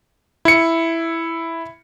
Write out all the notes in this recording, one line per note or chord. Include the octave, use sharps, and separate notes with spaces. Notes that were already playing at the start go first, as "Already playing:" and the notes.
E4 C#7